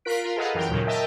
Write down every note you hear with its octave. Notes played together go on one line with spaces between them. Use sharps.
F4 A#4 F#6 B6 D7
F4 A#4
G#4 A4 B4 D#5 F5 F#5
F#2 E3 A#4 G5
D#2 A#2 C#3 F#3
A#4 D#5 E5 G5 A5